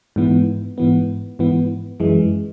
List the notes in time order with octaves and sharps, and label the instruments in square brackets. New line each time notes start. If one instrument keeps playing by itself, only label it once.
[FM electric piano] G#2 E3 B3
G#2 E3 B3
G#2 E3 B3
F#2 E3 G#3